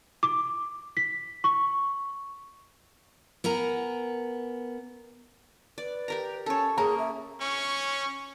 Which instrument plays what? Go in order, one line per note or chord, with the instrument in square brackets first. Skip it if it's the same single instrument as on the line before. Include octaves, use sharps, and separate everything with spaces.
[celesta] D6
B6
C#6
[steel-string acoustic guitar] B3 A#4 G#5 A#5
[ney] B4 [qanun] D5
[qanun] G4 A#4 A#5
[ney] C#4 [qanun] A4 C#5
[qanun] A#3 C#4 [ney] G#4 [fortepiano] A#5
[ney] E5
[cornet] C#4 [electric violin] C#6